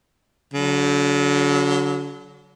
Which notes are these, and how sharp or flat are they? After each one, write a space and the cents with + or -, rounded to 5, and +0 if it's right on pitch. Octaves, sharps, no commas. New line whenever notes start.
D3 -40 F#3 +0